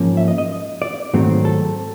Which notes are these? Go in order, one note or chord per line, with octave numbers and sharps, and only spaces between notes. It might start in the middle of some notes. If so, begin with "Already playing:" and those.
Already playing: G#2 F3 A#3 C#4
E5
D#5
D#5
D5
G#2 D#3 F#3 A3 C4
A4